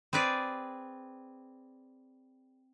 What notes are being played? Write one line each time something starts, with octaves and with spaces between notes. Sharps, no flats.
C4 G#4 B4 D5